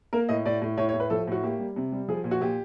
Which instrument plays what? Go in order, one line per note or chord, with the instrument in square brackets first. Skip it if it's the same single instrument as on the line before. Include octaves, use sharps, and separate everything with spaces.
[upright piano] A#3 A#4
A2 D#5
A2 D5
A2
A2 C#5
C#5
A2
B4
F3 A4
A2 F#4
A#3 G4
G3
C3
G3
F3 G#4
A#2
F#4
A#2 G4